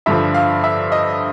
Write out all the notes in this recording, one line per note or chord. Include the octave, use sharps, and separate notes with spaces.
G2 D3 F3 E5
F5
E5
D#5